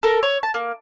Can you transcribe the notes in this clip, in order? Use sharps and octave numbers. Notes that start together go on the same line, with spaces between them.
A4 A#4
C#5
A5
A#3